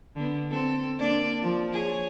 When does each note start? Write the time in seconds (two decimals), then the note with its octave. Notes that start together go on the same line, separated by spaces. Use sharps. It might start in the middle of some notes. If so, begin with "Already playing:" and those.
0.15 D3 B3
0.51 C4 A4
0.98 A#3 D4 D5
1.42 F3
1.73 G#4 C#5